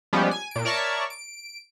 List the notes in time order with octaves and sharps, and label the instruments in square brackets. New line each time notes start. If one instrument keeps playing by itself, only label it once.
[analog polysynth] F3 G3 G#3 B3 C#4 G4
G#5
A#2 D7
A#4 C#5 D5 E5 A5 C#6
D7